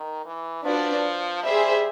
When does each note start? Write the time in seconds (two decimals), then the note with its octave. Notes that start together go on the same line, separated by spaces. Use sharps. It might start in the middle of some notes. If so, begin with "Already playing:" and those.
Already playing: D#3
0.26 E3
0.65 F3 D4 F#4 B4 D5
1.43 G3 G#4 C5 E5